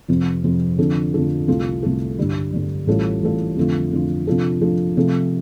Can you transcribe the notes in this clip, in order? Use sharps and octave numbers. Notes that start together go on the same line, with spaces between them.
F2 C3 F3 C4
F2 C3 F3 C4
F2 D3 F3 D4 A4
F2 D3 F3 D4 A4
C2 C3 A3 F4 A4
C2 C3 A3 F4 A4
G2 D3 G3
G2 D3 G3
A1 A2 G3 F4 A4
A1 A2 G3 F4 A4
F2 D3 A3 F4
F2 D3 A3 F4
C3 F3 D4 F4 A4
C3 F3 D4 F4 A4
C3 F3 A3 F4 A4